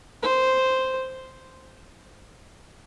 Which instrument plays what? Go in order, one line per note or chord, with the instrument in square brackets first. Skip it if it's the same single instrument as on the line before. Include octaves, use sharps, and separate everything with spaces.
[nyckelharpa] C5